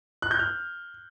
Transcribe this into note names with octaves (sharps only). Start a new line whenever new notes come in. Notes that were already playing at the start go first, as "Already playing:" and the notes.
F#6
G6
F6